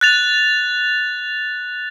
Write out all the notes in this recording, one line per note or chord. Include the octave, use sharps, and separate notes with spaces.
F#6 A6 F7